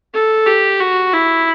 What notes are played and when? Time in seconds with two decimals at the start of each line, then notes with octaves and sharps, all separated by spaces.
0.14 A4
0.46 G4
0.80 F#4
1.13 E4